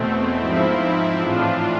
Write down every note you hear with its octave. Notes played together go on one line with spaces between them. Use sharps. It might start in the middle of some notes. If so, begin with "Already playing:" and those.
Already playing: E2 B2 A3 C4
G#2 F3 C4 E4
A2 E3 D4 F4